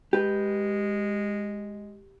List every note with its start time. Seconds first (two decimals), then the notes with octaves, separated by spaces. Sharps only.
0.13 G#3 G4 B4